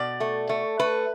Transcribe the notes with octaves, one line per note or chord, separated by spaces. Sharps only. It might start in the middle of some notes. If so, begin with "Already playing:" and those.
Already playing: B2 D5
A3
A3
A3 B4